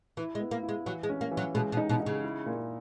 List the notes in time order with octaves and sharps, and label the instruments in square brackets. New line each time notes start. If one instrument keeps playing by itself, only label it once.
[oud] E3 [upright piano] E4
[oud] G#3
[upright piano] B3
[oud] A#3
[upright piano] E4
[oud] G#3
[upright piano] E3 [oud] F#3
[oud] G#3
[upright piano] C#4
[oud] A#3
[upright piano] E3
[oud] F#3
[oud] B2 [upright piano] G#3
[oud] B2
[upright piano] D#4
[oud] B2
[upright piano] D#4
[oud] C#3
[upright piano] E4
A#2